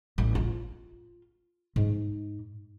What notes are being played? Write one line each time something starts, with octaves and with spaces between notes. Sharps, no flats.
A1
F4
G#2